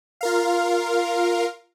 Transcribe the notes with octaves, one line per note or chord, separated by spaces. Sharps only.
F4 A#4 F5